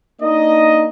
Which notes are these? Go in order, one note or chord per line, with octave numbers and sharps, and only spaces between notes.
A#3 D4 D#4 D#5